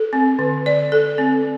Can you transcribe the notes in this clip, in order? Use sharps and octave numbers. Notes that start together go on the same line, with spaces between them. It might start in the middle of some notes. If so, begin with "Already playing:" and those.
Already playing: A4
C4
D3
D5
A4
C4